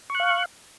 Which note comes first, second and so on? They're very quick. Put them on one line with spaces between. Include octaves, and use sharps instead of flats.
C#6 F#6 F5